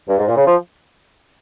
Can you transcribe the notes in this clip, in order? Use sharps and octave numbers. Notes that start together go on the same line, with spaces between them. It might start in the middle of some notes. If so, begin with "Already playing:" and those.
G2
G#2
A#2
C#3
F3